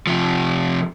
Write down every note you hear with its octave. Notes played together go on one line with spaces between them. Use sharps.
C3 F3